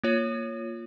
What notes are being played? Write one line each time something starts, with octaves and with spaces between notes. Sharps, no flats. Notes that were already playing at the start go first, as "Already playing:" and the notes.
A#3 F4 C#5